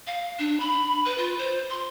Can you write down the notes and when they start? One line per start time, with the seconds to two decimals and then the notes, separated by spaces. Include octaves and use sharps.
0.07 F5
0.39 D4
0.60 B5
1.05 B4
1.18 F4
1.39 C5
1.70 C6